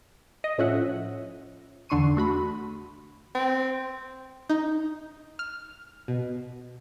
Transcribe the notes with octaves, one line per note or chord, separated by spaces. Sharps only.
D#5
A2 F3 C#4 E5 F#5
E2 D3 D4 C6 C#6 D#7
A3 F#4 B5
C4
D#4
F6
B2